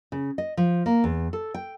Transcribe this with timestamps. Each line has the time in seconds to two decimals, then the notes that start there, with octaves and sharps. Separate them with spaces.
0.12 C#3
0.38 D#5
0.57 F3
0.86 A#3
1.04 E2
1.33 A4
1.54 G5